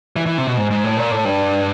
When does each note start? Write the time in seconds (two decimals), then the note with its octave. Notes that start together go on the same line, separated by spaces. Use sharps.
0.16 E3
0.26 E3
0.38 C3
0.47 B2
0.57 G#2
0.71 G#2
0.84 A2
0.97 A#2
1.11 A2
1.25 G2